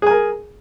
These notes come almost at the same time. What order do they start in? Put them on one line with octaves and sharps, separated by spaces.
G#4 G#5 A#4